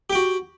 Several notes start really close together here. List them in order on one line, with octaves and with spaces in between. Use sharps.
G4 G5 F#4